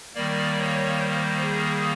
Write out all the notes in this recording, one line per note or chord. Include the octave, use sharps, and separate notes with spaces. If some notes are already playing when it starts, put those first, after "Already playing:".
D#3 G3 A#3 D5
C#5
C5
G#4